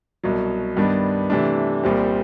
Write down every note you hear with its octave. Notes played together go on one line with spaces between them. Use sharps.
C2 B2 F#3
G2 D#3 G3 B3 D4
C3 E3 A3 D4
C2 A#2 G3 C4